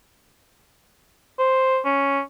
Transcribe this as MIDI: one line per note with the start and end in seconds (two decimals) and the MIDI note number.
1.39 1.80 72
1.85 2.21 61